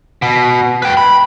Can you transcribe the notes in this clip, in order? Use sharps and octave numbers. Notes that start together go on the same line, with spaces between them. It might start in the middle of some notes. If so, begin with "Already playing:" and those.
B2
B4 G5
B5